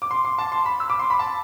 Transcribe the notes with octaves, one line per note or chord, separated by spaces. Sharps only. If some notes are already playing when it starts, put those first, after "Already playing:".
D6
C6
C6
A5
C6
B5
E6
D6
C6
B5
A5